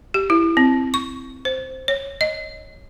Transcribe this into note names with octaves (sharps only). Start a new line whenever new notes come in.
G4
E4
C4
C#6
C5
C#5
D#5